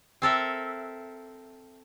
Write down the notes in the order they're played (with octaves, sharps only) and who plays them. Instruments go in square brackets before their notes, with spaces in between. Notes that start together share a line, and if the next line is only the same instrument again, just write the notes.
[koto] C4 A4 A#4 E5